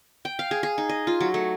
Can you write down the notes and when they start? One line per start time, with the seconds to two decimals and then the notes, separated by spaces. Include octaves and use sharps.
0.25 G5
0.39 F5
0.51 G#4
0.63 G#4
0.78 D#4
0.89 D#5
1.07 F4
1.21 F#3
1.34 A3